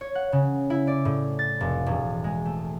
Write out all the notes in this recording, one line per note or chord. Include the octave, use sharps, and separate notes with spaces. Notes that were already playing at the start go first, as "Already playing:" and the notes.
C#5
F#5
C#3
E4
D5
A2
A6
F1
E1
G#3
A3